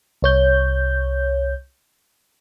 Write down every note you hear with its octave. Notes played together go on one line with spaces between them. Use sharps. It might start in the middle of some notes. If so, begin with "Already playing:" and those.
C2 C#5 G6